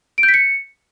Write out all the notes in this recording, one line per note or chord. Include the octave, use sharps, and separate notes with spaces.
D7
G6
B6
C#7